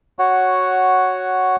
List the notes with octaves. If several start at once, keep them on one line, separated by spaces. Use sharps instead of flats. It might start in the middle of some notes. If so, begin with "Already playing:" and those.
F#4 C#5 F#5